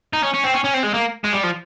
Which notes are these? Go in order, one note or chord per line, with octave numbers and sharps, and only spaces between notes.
D#4
C#4
C#4
C4
C#4
C#4
C4
G#3
A#3
G#3
G3
F3